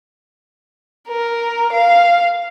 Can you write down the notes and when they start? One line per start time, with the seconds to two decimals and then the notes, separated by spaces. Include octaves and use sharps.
1.09 A#4
1.73 F5